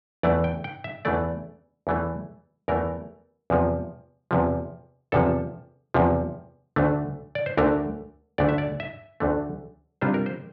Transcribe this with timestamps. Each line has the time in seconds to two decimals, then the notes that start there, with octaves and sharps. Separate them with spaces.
0.23 E2 E3 A3 D5
0.44 G5
0.64 G5
0.84 E5
1.05 E2 E3 A3 D5
1.87 E2 E3 A3
2.68 E2 E3 A3 A#4
3.50 E2 C3 F3
4.31 E2 C3 F3
5.12 E2 C3 F3 A4
5.94 E2 C3 F3
6.76 D2 D3 A3
7.35 D5
7.46 C5
7.57 D2 D3 A3 A#4
8.38 D2 D3 A3 D5
8.49 E5
8.58 D5
8.80 E5
9.20 D2 D3 A3
10.01 C3 G3 D4 F4 C5
10.14 A#4
10.26 C5